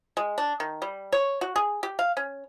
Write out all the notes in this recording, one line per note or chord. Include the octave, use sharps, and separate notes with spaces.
G#3
D4
D#3
G3
C#5
F#4
G#4
G4
F5
C#4